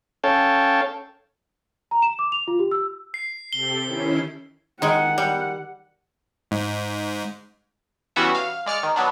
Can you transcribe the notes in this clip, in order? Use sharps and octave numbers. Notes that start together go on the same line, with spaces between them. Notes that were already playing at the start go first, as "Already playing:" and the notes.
C#4 A4 C#5 F5 G5 A5
A#5
E7
D6
F7
F4
G4
E6
C7
C3 G4 A4 G7
D#3 C#4 E4
D#3 G#3 F#5
G3
G#2
E3 G3 B3 C#4 F#4 E5
F5
G#3 D5 F6 C#7
D#3
F#3 B3 D4